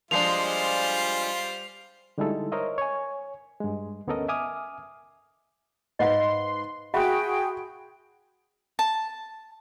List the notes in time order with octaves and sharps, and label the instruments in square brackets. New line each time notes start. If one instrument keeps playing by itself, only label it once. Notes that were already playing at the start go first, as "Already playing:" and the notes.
[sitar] F3 G#3 D4 [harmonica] G3 F4 [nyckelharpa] C5 [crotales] C7 F7
[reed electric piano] D3 G3 G#3 D#4 E4 A4
A#4 C5 C#5 D#5 E5
C#5 G#5
G2 G#3
D2 B3 C#4 A4 A#4 D#5
E5 G#5 D6 D#6 F6
[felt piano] G#2 B4 F#5 [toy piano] D#5 F5 [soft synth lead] C6
[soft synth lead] F#4 [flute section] G#4 G5 [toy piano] E5 F#5 [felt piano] B5 C6 F#6
[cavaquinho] A5